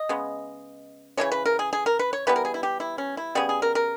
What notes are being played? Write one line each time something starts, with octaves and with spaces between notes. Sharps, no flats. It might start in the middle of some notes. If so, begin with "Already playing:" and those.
Already playing: D#5
C#3 G#3 B3
C#3 E3 G#3 C#5
B4
A#4
G#4
G#4
A#4
B4
C#5
E3 G3 B3 B4
A#4
G#4
E4
G4
E4
C#4
E4
C#3 G3 B3 G#4
G#4
A#4
A#4